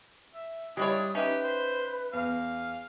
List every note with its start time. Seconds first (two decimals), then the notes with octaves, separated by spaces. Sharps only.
0.34 E5
0.77 G3 G#3 D4 E4 G4 C#5 D#6
1.15 C#4 D#4 G4 B4 E5
1.44 C5
2.13 E2 F5